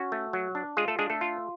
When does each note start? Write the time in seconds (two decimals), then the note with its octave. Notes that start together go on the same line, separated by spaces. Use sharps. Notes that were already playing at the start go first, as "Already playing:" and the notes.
Already playing: C#4 F#4
0.12 A3
0.33 F#3
0.55 D4
0.77 G#3 F4 G#4
0.88 A3 A4
0.99 G#3 D4 G#4
1.10 A3 A4
1.21 F4